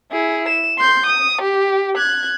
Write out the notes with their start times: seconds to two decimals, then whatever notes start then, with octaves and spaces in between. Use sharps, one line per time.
0.12 E4 G#4
0.49 E7
0.78 C6 G6
1.07 D#6
1.42 G4
1.98 F#6 G#6